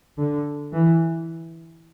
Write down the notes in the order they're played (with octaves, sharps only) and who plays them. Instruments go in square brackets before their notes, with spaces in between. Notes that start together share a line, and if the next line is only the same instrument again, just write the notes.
[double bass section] D3
E3